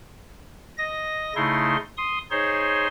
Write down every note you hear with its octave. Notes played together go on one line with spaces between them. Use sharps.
D#5 A#6
C#3 A3 D#4 E4 C6
C6 D#6
D#4 G#4 C5 C#5 C6